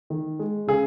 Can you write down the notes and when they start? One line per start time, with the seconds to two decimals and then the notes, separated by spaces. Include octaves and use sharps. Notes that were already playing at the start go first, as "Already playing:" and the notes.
0.10 D#3
0.39 G#3
0.67 C#3 G#4